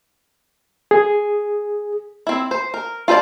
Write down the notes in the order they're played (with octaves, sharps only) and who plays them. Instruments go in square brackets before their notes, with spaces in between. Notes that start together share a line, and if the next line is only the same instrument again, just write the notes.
[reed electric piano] G#4
[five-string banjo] C4 E4
C5
A#4
F4 A4 C5 D5 A5